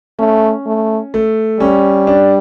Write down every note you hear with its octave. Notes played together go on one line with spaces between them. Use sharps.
A3 C#4
A3
A3
G3 C#4
D4